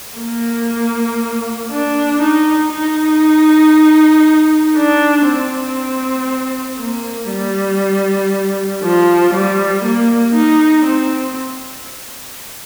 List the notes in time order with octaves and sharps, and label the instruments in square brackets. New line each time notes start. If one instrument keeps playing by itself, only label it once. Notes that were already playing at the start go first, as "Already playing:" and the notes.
[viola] A#3
D4
D#4
D#4
D4
C4
A#3
G3
F3
G3
A#3
D#4
C4